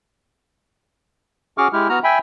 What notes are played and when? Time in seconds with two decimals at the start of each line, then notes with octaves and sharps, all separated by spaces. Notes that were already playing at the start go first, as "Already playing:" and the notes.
1.58 C#4 F#4 G#4 C#6 D6 F6
1.73 G#3 E4 G4 F6
1.89 B3 F#4 A#5 F6
2.04 E5 G5 G#5 B5